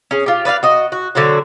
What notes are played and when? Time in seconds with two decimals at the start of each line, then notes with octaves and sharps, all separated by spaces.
0.11 C#4 G#4
0.26 F4 G4
0.45 B4 D5 E5 F5
0.63 F#4 D#5
0.92 F#4
1.15 D3 F#3 C4 F#4